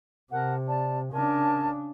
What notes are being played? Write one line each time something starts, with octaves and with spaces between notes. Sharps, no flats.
C3 A#4 F#5 A5
D5 A5
C#3 D4 A#4 G#5 A5